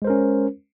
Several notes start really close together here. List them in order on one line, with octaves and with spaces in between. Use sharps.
G#3 C5 A#4 C#4